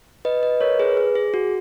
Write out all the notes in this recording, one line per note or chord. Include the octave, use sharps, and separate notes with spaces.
B4 D#5
B4 D#5
A#4 C#5
G#4 B4
G#4
G#4
F#4